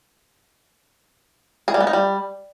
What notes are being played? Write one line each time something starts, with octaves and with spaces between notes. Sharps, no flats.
G#4
G3
B3
D#4
G3